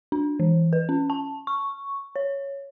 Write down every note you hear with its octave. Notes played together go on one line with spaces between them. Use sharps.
D4
E3
B4
C#4
A5
C#6
C#5